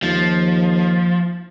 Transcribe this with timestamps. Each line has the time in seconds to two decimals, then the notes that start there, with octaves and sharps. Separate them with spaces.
0.03 D#2 F3